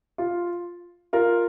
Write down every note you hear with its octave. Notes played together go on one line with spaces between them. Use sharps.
F4
F4 A#4